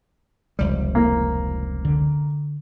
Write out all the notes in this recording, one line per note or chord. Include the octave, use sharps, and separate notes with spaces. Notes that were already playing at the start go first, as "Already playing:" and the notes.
F1 C#2 G3
A#3
D3